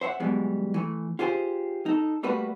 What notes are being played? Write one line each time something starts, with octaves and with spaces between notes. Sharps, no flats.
C5 E5 F#5
F#2 B2 E3 G3 G#3
E3 A3
F4 G4 G#4 C5
D#4 A4
G3 A3 A#3 F#4 B4